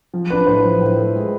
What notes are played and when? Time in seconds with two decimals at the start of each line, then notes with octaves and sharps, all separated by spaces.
0.14 F3
0.30 D4 B4
0.47 A2 C5
0.65 F3
0.81 A2
0.98 A3
1.15 G#3